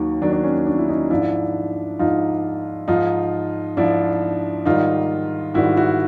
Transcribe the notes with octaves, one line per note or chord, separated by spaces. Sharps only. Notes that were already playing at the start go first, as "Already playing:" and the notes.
Already playing: D#2 D#3 F#3
D#2 D#3 F#3 D4
D4
C#4
D4
E4
C#4 D#4
G#2 F3 D4 E4
G#2 F3 D#4 F4
G#2 F3 D#4 F4
G#2 F3 D4 E4
G#2 D#3 G3 D#4 F4
G#2 D#3 G3 E4 F#4
E4 F#4